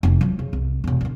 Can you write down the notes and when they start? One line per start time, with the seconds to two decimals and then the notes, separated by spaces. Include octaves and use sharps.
0.03 F1 E4
0.21 F3 F#3
0.39 C#3
0.53 C2
0.84 E1 C#3
1.01 D3 F4